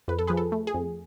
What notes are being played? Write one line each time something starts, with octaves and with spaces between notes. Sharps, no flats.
F2 B4
A4
F3 G#4 B4
A4
A3
G#4
F2